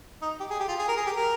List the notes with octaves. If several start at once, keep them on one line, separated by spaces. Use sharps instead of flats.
D#4
G4
G#4
G4
F4
G#4
A#4
G#4
G4
A#4